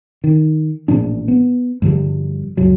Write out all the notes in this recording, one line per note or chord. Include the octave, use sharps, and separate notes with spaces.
D#3
A1 A#2 F3 D4
B3
G2 D3 F3 G3
C#2 F#2 F#3